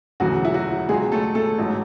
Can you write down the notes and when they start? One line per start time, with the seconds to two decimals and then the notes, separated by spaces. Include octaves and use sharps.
0.20 E1 D2 C#3 E3 F#3 F#4
0.45 E4
0.54 F#3 F#4
0.89 C#2 B2 F#3 G#3 G#4
1.12 A3 A4
1.35 A3 A4
1.58 A1 G#2 F#3